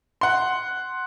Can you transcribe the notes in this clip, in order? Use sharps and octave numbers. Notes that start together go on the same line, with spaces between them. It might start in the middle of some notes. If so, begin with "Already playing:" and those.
F#5 C6